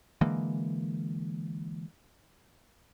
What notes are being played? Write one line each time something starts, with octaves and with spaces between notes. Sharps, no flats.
D3 E3 G#3 A#3